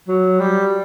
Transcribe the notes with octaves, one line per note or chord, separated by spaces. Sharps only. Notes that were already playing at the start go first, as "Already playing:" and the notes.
F#3
G3